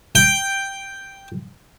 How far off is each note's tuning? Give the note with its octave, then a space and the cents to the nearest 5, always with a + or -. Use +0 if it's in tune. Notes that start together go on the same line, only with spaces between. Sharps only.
G5 +0